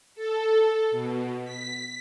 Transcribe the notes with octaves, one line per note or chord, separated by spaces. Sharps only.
A4
B2
B6